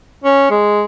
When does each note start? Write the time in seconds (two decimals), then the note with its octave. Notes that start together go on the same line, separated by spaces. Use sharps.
0.24 C#4
0.50 G#3